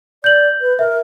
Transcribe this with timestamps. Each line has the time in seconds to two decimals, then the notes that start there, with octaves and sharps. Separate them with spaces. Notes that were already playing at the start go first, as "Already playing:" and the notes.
0.24 D5 G6 F#7
0.61 B4
0.79 A#4 E5